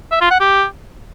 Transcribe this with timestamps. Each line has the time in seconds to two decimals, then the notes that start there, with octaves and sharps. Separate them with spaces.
0.11 E5
0.21 F4
0.31 F#5
0.40 G4